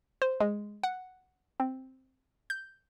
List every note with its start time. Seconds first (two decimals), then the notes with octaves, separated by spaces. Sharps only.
0.22 C5
0.40 G#3
0.83 F#5
1.60 C4
2.50 G6